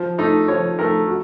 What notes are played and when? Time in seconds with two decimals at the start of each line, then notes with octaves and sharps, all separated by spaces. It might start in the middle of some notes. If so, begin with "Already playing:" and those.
Already playing: F3
0.18 A3 D#4
0.48 F3 C#5
0.78 A3 D#4 A#4
1.08 F#4